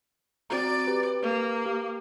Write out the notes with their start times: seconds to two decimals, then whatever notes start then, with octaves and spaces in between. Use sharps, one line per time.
0.50 C4 F#4 D5 A#5
0.87 G4 B4
1.22 A#3
1.66 G4